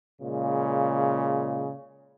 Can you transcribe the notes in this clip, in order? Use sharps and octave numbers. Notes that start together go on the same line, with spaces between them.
A#2 C#3 G#3